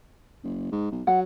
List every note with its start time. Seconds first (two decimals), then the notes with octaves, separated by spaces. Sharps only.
0.44 F#1
0.72 G#2
0.91 B1
1.07 F#3 F#5